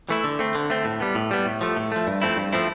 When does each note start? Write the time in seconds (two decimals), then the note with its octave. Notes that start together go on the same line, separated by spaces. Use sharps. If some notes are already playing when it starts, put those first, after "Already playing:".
0.09 E3 A3 E4
0.24 D3
0.39 A3 C4
0.55 D3
0.70 A3 C4
0.85 A2
1.00 G3 B3
1.15 A2
1.31 G3 B3
1.46 A2
1.61 F3 A3
1.77 A2
1.92 F3 A3
2.07 G2
2.22 F3 A3 C4 E4
2.37 G2
2.53 F3 A3 C4 E4